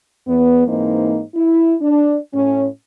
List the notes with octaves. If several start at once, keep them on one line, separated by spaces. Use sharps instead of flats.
E2 B3
G#2 E3 A#3 C4 D#4
E4
D4
A2 C#4